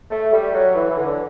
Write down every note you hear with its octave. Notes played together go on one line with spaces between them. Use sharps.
A3
G3
F#3
E3
E3
D3